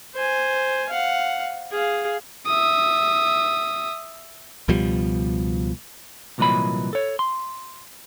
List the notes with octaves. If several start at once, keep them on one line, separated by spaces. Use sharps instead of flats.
C5 G#5
F5 F#5
G#4 F5
E5 D#6
C#2 B2 F3 G3
C2 A#2 E3 F#3 D#5 B5
A4 C#5
C6